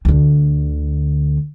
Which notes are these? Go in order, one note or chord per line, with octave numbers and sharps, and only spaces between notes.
D2 D3